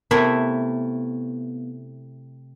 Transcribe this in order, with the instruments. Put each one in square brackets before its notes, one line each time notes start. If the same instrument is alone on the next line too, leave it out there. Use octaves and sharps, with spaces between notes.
[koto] C3 A3 E4 [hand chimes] B3 [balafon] A#4